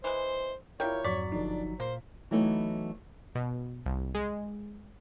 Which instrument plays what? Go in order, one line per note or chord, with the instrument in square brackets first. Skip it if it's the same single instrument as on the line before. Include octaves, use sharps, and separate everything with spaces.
[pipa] E3 G#3 [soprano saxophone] C5
[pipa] G3 G5 [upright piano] E4 F4 A#4 [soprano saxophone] C#5
[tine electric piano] F2 G#2 [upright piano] F#3 C#6 B6 [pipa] D5
[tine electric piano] G1 F3 D#4 [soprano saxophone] D4
[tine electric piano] A#2 [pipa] A#3 [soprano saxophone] C5
[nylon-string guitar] E3 F#3 A3 B3 D#4
[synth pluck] B2
C2
G#3